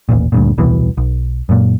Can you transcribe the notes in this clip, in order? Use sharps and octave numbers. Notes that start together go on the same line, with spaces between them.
D#1 A1 A#2
D2 G2 A#2
D#1 C2 B2 E3
B1
F#2 A#2